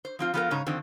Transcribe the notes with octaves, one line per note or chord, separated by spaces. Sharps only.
C5
F3 C4 F4
F3 B3 F4 G4 A4 A#4
G#2 C#3 C#5 A#5
F2 D3 D#3 C4